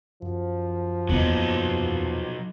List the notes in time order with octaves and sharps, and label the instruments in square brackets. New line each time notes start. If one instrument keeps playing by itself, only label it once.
[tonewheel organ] F#2 [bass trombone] F3
[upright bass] E2 A#3 [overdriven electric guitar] F#3 D#4